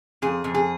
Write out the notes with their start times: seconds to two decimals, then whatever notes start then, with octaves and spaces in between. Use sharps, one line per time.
0.22 F2 G#4
0.44 F2
0.55 G#4